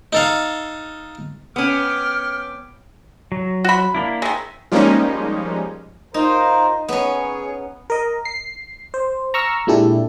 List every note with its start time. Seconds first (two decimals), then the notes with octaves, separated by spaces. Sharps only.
0.13 D#4 A4 F5
1.56 B3 C#4 G5 D6 F6
3.32 F#3
3.65 F#4 B5
3.95 A#3 D4 E4
4.22 D#3 G#3 E5
4.72 F3 G3 G#3 A#3 C#4 D#4
6.14 D#4 F4 A#4 C5
6.89 B3 C#4 G#4 C#5
7.90 A#4 D#5
8.25 C7
8.94 C5
9.34 A#5 C#6 E6 F6
9.67 A#2 G#3 D4 E4 G4 A4